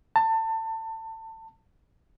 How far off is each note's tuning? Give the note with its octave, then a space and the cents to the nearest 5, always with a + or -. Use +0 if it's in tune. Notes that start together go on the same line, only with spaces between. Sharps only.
A5 +25